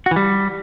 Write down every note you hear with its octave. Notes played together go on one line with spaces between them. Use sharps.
F#4
E3
G3